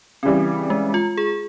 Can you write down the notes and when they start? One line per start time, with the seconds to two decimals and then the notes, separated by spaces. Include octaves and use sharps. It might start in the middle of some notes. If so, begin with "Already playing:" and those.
0.23 C#3 E3 G3 C4
0.70 G#3
0.94 F4
1.17 G#4